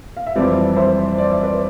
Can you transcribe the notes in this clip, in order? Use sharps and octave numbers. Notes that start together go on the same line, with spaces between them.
F5
E5
F2 E3 G3 C4 B4 D5
C5 E5
D5
E5
B4 D5